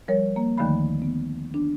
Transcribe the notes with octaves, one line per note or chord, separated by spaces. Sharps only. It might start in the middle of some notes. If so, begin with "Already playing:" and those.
F3 G3 A#4 C#5
A#3
D#2 D3 D#3 F3 A3 B5
B3
D4